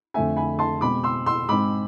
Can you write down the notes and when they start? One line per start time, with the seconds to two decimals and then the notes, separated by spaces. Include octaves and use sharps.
0.14 F2 D3 A3 C4 E5 G#5
0.37 G#5 B5
0.59 A5 C6
0.81 B2 G#3 C4 B5 D6
1.04 C6 E6
1.26 C6 E6
1.49 G#2 G#3 C4 B5 D6